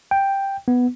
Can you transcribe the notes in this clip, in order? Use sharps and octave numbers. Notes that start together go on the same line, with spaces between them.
G5
B3